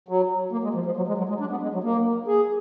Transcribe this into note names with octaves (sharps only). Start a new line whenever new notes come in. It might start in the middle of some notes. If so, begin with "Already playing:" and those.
F#3
A#3
G#3
F3
F3
F#3
G#3
F#3
G#3
D4
B3
G#3
F#3
A#3
G#4